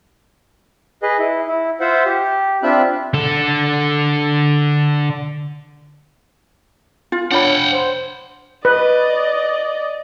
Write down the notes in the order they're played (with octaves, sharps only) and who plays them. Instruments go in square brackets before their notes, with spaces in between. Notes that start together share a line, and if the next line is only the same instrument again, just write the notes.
[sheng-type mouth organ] G#4 B4 D#5
E4
E4
F4 C5 E5 F#5
G4
C4 D4 F4 E5 B5 F#6
[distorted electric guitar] D3 A4
[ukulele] F4
[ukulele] D4 B5 [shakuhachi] C#5 [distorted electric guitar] F#5 G5
[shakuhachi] C5
[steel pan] B4 [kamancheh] D5 D#5